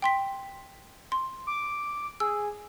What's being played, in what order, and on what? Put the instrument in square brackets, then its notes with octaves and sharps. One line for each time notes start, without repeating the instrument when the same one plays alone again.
[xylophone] G5 C6 B6
C6
[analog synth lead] D6
[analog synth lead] G#4 [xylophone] E6